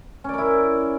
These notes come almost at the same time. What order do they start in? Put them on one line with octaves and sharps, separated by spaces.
C#4 D5 A#4 E4